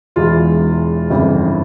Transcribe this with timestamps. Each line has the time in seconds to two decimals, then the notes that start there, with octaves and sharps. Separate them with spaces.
0.16 E1 E2 E3 G#3 F4
1.10 G1 F2 C#3 E3